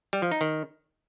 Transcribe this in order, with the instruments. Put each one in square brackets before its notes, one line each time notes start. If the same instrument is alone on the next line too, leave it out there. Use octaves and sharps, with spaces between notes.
[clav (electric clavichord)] G3
F3
D#4
D#3